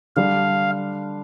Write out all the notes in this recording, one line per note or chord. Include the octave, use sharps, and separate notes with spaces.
D3 G3 D4 F5